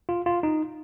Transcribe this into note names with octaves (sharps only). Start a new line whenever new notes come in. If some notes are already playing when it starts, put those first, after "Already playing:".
F4
F4
D#4